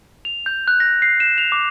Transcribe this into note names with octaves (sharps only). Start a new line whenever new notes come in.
F7
G6
F#6
A#6
C7
E7
F7
D6